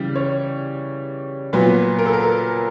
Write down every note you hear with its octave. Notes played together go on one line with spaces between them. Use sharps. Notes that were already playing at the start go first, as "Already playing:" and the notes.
Already playing: C#3 E3 G3
C#5
A#2 F#3 B3 B4
A#4
A4
A#4